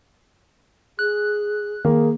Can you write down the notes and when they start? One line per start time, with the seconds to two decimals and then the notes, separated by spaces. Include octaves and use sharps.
0.99 G#4 F#6
1.85 D#3 A#3 G#4